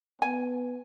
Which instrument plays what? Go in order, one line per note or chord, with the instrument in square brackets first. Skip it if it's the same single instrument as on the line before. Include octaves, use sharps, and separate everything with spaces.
[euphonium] B3 [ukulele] G#5